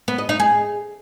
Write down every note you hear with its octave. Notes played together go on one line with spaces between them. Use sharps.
B3
D#5
D#4
G#4